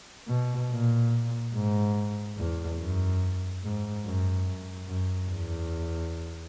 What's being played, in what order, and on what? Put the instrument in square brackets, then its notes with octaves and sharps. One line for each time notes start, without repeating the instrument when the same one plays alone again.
[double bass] B2
A#2
G#2
E2
F#2
G#2
F#2
F#2
F#2
E2